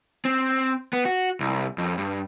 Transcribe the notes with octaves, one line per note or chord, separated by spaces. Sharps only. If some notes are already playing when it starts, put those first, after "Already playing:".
C4
B3
F#4
C2
F2
G2